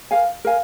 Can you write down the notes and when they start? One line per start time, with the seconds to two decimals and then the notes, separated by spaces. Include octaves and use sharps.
0.11 A#4 F5 G#5
0.45 A#4 F5 G#5